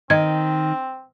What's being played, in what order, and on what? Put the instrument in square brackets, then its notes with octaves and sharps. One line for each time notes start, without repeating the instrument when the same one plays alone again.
[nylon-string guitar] D#3 [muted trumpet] C4 [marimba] D#5 G#6